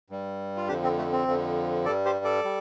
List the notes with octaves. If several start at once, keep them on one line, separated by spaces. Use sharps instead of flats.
G2 G3
F4
F2 D3 F3 D4 G4
C4
A3
C4
F2 D3 F3
G2 G3 A4 D5
G4 C5
A4 D5
G3